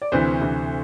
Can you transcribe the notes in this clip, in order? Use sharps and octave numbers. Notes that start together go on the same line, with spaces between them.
D5
D2 C3 E3 C5
D2 C3 E3